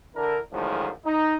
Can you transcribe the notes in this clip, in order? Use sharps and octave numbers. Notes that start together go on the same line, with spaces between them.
D3 D4 E4 A#4
F#2 A2 D3 D#3 F3 G#3
D#4